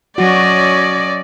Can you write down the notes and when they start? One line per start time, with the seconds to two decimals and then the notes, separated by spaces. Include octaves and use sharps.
0.18 F#3 C#4 F#4 D5 D#5